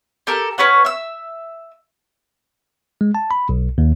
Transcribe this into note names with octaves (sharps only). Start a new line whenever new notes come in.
G4 A4 A#4
C#4 B4 C#5 F#5
E5 E6
G#3
A5
B5
B1
D#2